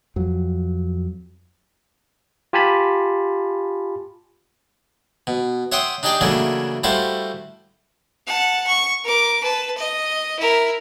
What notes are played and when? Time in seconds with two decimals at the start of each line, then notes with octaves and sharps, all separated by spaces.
0.16 F2 F#3
2.53 F4 G4 G#5 A5 B5
5.27 B2
5.72 C#5 E5 F#5 G5 C6 D#6
6.03 D4 D#4 G4 G#4 D5 G5
6.21 C#3 E3 F#3 A3 A#3 D4
6.84 G3 A3 E4 F#4 C5 F5
8.27 F#5 A5
8.67 C#6
9.04 A#4 D6
9.43 B4 A5
9.78 D#5
10.40 E4 A#4